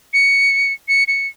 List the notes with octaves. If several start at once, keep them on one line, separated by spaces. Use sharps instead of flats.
C#7
C#7
C#7